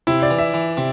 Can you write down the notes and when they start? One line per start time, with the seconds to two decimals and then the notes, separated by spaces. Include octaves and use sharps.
0.07 C3 E4
0.22 D5
0.30 E3
0.38 E5
0.54 E3
0.77 C3